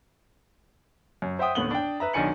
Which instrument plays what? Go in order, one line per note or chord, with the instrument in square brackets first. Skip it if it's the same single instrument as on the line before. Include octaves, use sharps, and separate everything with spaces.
[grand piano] F#2
C5 E5 F#5 G5 D#6
D#2 A2 D3 B3 F#7 G7
D4 G5
B4 E5 A#5
B1 D#3 D4 G#5 C#7 F#7